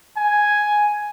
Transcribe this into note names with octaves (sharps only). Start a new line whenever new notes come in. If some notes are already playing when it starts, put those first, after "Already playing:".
G#5